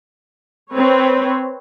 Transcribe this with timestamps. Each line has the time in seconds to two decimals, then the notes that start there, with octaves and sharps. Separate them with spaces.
0.73 C4 B4 C#5